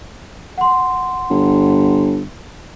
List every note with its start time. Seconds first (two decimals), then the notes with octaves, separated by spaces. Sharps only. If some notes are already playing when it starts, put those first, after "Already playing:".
0.58 F#5 C6
1.30 G1